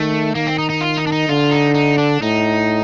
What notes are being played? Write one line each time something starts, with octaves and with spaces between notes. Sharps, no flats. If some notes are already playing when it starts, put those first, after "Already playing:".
Already playing: D#3 A3
D#3 A#3
C4
D#4
D#4
F4
D#4
D4
D#4
D3 F4
D#4
D#4
D4
A2 D#4